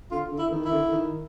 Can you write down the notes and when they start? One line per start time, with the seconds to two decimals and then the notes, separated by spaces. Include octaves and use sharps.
0.11 D3 F4
0.31 D3
0.38 E4
0.52 D#3
0.65 E4
0.72 D3
0.92 D#3